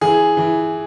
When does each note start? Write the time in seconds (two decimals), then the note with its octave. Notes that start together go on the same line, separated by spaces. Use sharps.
0.01 E3 G#4
0.37 E3